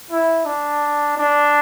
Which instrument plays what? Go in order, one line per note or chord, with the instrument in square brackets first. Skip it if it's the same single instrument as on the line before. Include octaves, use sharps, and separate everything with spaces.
[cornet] E4
D4
D4